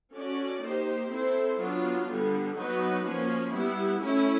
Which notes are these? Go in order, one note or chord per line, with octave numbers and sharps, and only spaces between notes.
C#4 F#4 A4 D5
A#3 D#4 G4 C5
C4 E4 A4 C5
F#3 B3 D4 F4
D3 G3 B3
F#3 B3 D#4 F#4 B4
F3 A#3 C#4
G3 B3 E4
A3 C#4 E4